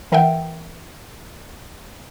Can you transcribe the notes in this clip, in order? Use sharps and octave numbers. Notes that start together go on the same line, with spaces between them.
E3 A#4 E5 F#5 G5